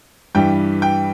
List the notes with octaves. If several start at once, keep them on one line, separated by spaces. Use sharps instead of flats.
G2 E3 G3 G5
G5